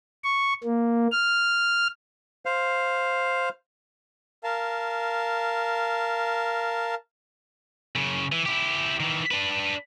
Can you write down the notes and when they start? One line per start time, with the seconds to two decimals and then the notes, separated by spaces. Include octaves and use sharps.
0.24 C#6
0.64 A#3
1.11 F6
2.46 C5 F5
4.44 A#4 F5 A5
7.95 F#2 C#3
8.32 E3
8.46 E4 G4
9.00 D#3 E3
9.31 D4 B4